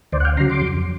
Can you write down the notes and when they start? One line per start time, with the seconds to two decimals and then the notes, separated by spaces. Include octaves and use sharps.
0.12 D2 C5 D5
0.20 F#5
0.25 F5 G5
0.37 C#3 A#5 C6
0.40 F#3
0.49 C6 D6
0.61 F2